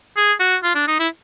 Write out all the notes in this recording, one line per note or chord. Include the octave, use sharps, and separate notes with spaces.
G#4
F#4
F4
D4
D#4
E4